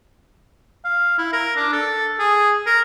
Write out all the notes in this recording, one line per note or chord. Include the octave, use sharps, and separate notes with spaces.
F5
E4
A#4
D4
A4
G#4
A#4